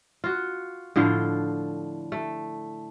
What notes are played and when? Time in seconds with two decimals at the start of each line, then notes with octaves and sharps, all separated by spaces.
0.24 F4 F#4
0.96 A2 D3 F3 F4
2.12 A3